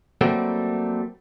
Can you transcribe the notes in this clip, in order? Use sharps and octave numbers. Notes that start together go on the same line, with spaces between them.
F#3 G3 A3 A#3 C4